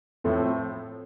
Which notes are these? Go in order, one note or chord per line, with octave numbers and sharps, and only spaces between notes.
A2 F3 A3 C4